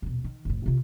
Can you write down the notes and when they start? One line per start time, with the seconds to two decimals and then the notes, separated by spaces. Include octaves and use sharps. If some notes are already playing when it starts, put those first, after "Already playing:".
0.02 D#1 B2
0.24 D#3
0.45 F1 A2
0.66 C3 F4